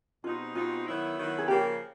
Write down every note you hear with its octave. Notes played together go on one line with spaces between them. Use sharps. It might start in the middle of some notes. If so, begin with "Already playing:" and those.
B2 G3 C4 D#4 F4
B2 G3 C4 D#4 F4
D#3 F#3 B3 E4
D#3 F#3 B3 E4
G#4
C#3 F3 A#3 G4